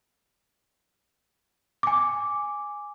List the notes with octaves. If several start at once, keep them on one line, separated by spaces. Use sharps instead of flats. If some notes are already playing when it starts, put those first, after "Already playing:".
G#5 D6